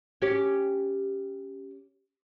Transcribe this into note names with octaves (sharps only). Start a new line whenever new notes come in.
C#4 G4